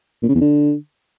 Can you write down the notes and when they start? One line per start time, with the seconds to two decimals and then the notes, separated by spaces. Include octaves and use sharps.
0.22 A#2
0.29 C#3
0.35 E2
0.41 D3